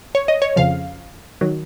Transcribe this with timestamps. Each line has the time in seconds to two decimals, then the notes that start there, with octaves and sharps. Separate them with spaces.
0.15 C#5
0.28 D#5
0.42 C#5
0.56 F2 C#3 F3 F5
1.41 D#3 F#3